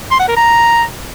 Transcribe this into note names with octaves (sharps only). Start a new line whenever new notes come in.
C6
F#5
A#4
A#5